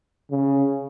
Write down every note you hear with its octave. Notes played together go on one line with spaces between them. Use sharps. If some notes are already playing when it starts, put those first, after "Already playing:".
C#3